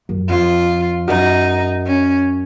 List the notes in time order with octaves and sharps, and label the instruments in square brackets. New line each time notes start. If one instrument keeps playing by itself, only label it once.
[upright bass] F#2
[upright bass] F2 [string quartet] F4
[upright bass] F#2 [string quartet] D#4
[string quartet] C#4